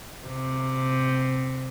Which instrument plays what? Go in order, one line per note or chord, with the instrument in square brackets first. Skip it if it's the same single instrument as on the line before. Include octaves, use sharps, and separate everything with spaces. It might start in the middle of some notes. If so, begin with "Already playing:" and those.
[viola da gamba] C3